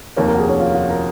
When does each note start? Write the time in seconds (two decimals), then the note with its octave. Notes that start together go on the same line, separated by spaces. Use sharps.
0.17 F1 D#2 D#3 A#3 C#5
0.28 A#4
0.35 F#4
0.39 G#4
0.49 C#4
0.60 F4
0.74 F#4
0.89 A#4